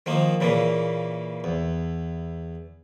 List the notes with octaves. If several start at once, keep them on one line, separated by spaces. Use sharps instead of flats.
D#3 F3 A#3
A#2 C#3 E3 A#3
E2